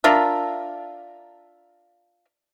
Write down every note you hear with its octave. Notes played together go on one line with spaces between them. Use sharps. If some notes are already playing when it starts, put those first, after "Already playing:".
D4 F4 A#4 E5